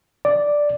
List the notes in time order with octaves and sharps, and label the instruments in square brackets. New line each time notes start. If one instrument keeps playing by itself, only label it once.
[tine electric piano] D5